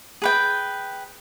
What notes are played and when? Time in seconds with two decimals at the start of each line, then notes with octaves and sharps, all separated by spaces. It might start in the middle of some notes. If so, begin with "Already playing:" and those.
0.22 G#4 B4 G5